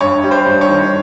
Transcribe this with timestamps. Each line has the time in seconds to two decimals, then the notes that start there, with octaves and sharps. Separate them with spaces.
0.01 G2 C#5
0.23 G3
0.31 C5
0.46 G2
0.61 C#5
0.69 D#3